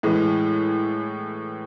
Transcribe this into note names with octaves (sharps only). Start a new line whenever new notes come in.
A2 E3 G#3